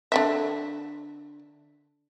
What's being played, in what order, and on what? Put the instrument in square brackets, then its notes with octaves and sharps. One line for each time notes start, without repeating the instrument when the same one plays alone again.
[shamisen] D3 E3 E5